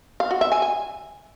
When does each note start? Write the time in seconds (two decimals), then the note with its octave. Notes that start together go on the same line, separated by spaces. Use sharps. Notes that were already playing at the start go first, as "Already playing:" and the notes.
0.20 F5
0.31 F#4
0.41 E5
0.52 G#5
0.62 G#5